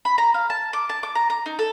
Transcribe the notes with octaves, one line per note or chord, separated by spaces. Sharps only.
B5
A#5
F5
A5
D6
A5
D6
A#5
A#5
D#4
A4